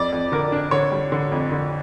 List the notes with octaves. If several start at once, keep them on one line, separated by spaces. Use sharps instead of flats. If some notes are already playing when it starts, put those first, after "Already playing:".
Already playing: F2 D5
F2
D3 A#4
D4
D3 C#5
G3
D3
F2
D3